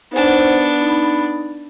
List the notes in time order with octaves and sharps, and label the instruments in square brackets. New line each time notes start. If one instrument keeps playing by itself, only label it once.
[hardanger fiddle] B3 D4 [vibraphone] D#4 C5 F#5
[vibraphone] D#4 B5